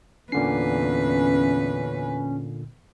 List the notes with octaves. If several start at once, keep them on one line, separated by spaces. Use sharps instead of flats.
E2 A#2 D3 C#4 B4 C7